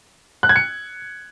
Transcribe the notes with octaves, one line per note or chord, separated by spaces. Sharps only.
F#6
G#6
C#7